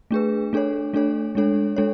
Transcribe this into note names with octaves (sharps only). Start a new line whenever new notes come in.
A3 D4 G#4 B4
A3 D4 A4 C#5
A3 D4 A4 C#5
G#3 D4 A4 C#5
G#3 D4 A4 C#5